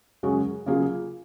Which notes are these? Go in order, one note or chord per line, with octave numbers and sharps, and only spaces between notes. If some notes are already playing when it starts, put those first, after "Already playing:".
F#2 C#3 G#3 C#4 F#4
C#3 F#3 A#3 F4 G#4